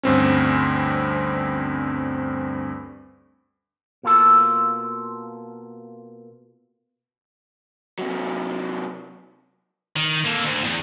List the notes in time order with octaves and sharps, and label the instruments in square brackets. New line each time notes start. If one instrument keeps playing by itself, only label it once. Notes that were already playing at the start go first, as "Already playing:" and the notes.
[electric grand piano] D2 G2 C4 C#4
[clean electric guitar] B2 A#3 F4 A4
[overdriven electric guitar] C3 F#3
[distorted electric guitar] D#3
A#3 A4
D2
E2